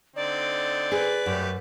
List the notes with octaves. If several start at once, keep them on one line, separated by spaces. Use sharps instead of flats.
D3 C4 D#4 D5
G#4 B4
F#2 G3 A3 G4